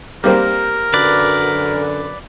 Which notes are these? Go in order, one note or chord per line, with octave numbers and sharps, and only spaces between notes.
G3 A#3 C4 A#4
F#2 D3 B4 D5